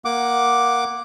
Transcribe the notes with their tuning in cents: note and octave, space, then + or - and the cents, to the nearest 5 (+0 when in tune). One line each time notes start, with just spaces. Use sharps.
A#3 +10 F#5 +0 D6 +0